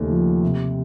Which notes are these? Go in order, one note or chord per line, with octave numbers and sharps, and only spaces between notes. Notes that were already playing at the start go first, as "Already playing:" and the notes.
Already playing: D#2 C#3 A3
F3
C3